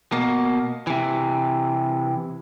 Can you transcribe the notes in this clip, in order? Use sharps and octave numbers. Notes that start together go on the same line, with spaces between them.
B2 A#3
C3 E3